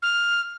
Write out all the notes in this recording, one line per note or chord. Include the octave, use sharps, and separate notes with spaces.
F6